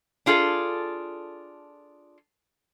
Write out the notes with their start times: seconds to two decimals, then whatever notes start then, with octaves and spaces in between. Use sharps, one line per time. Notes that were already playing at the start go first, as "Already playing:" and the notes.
0.26 D4 F4 G#4 A4